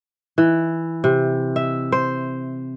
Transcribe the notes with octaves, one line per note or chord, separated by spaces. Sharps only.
E3
C3
E5
C5